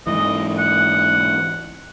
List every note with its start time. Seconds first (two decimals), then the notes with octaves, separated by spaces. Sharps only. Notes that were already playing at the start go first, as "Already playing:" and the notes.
0.07 G#2 E3 D#5
0.59 F#5